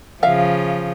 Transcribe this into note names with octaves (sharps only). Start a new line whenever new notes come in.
C#3 F3 E5 F5